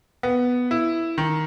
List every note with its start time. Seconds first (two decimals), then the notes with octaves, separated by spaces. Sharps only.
0.23 B3
0.71 E4
1.18 D#3